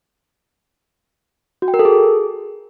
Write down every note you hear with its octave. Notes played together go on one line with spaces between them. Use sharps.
F#4
G5
A#4
A4
G#4